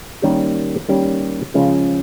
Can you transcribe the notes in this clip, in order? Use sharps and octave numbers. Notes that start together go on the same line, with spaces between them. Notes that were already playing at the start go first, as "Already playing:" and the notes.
D#3 G3 A#3 C#4 G4
D#3 G3 A#3 C#4 G4
C#3 F3 G#3 C#4 F4